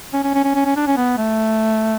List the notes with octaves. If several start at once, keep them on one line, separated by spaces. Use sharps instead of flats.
C#4
C#4
C#4
C#4
C#4
C#4
D4
C#4
B3
A3